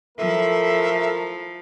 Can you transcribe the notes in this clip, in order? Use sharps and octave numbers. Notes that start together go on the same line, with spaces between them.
F3 A3 E4 A4 A#4 E5